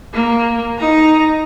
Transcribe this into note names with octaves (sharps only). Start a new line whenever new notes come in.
A#3
D#4 A#5